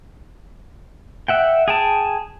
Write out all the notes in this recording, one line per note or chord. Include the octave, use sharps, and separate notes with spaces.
E5 F#5 G5
G#4 G5 A5